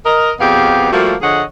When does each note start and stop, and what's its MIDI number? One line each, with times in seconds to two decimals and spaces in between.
0.05 0.31 70
0.05 0.31 75
0.40 0.90 41
0.40 0.90 47
0.40 0.90 59
0.40 0.90 67
0.40 0.90 68
0.40 0.90 77
0.92 1.15 53
0.92 1.15 55
0.92 1.15 57
0.92 1.15 58
0.92 1.15 66
1.22 1.42 50
1.22 1.42 53
1.22 1.42 68
1.22 1.42 73
1.22 1.42 75
1.22 1.42 78